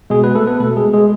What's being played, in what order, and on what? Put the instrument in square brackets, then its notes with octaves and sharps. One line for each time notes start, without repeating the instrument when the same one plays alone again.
[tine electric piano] B2 G#3 G#4
B3 B4
A3 A4
B3 B4
B2 A3 A4
G#3 G#4
G#3 G#4